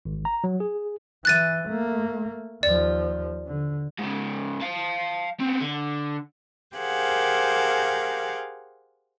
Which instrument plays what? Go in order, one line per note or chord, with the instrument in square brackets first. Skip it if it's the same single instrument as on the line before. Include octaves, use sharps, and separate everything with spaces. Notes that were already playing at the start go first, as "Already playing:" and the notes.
[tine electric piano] G#1
A#5
F#3
G#4
[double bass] E3 [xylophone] F#6 A6 D#7
[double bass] A3 A#3
[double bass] D#2 F3 [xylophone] D5
[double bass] D3
[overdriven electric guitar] G#2 C#3
F5 A5
B3 C4
D3
[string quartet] G4 G#4 A#4 C5 F5 F#5